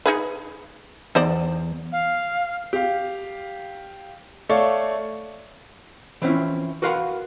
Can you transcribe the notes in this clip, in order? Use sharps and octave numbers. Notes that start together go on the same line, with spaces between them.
D#4 G#4 B4
E2 D#4 C5 D5
F5
G4 F5
A3 A4 C#5 D5 F5
E3 F3 C4 C#4 E4
F#4 A#4 B4 F5 F#5 C6